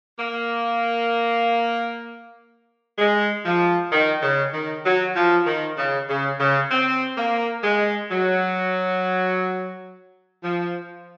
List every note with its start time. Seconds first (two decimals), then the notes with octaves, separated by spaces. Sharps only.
0.19 A#3
2.98 G#3
3.45 F3
3.92 D#3
4.23 C#3
4.54 D#3
4.85 F#3
5.16 F3
5.47 D#3
5.78 C#3
6.09 C#3
6.40 C#3
6.71 C4
7.18 A#3
7.64 G#3
8.11 F#3
10.43 F3